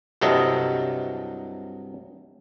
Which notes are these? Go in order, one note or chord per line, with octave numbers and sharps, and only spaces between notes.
C2 G2 C3 F#3 A4 D#5